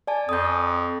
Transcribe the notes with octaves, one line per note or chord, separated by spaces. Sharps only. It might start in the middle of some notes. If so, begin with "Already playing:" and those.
D5 G#5 A5
F2 D#6 G6
G6